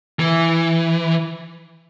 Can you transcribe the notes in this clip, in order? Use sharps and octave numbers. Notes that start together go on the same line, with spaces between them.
E3